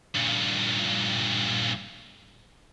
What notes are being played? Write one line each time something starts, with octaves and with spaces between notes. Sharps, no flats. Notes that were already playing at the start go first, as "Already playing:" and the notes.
G2 A#2